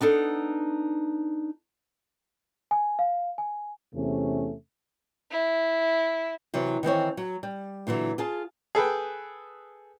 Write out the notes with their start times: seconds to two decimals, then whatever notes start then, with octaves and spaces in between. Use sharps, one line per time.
0.01 B3 D4 D#4 A4
2.71 G#5
2.99 F5
3.38 G#5
3.94 E2 C3 A3 C#4
5.31 E4
6.54 C3 E3 F#3
6.83 D#3 E3 C4 C#5
7.17 F#3
7.43 G3
7.87 A#2 D3 E3 F#3
8.18 F4 G#4 A5
8.75 G#4 A4 B4 G5